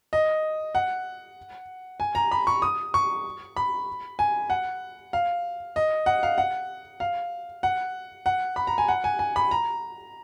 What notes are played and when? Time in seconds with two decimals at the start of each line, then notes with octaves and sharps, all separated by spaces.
0.13 D#5
0.75 F#5
2.00 G#5
2.15 A#5
2.31 B5
2.47 C#6
2.62 D#6
2.94 C#6
3.56 B5
4.19 G#5
4.50 F#5
5.13 F5
5.76 D#5
6.06 F#5
6.23 F5
6.38 F#5
7.00 F5
7.63 F#5
8.26 F#5
8.56 B5
8.67 A#5
8.78 G#5
8.88 F#5
9.04 G#5
9.19 G#5
9.36 B5
9.51 A#5